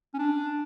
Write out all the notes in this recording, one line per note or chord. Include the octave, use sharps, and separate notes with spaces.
C#4
D4